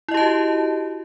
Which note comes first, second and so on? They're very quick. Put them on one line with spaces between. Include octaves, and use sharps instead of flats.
E4 D#5 G4 A5 F#4